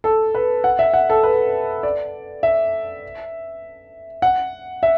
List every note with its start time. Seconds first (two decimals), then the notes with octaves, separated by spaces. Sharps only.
0.04 A4
0.35 B4
0.64 F#5
0.79 E5
0.94 F#5
1.10 A4
1.23 B4
1.83 D5
2.43 E5
4.22 F#5
4.83 E5